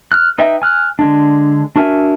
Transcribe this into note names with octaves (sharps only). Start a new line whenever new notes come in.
F6 F#6
D#4 B4 D#5 E5 G5
G#5 F6 F#6
D3 G#3 D4
D4 F#4 A#4 E5 G#5